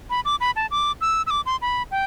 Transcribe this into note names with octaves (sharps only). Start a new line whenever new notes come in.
B5
D6
B5
A5
D6
E6
E6
D6
C6
B5
G5